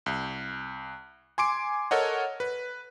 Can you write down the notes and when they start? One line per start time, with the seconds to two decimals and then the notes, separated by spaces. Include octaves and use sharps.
0.06 C2
1.38 G#5 C6 D6 D7
1.91 A4 A#4 C#5 D#5 F#5
2.40 B4